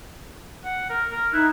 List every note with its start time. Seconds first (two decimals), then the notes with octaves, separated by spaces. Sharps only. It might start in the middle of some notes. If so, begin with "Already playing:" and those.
0.65 F#5
0.90 A#4
1.11 A#4
1.33 D#4 E4 F#6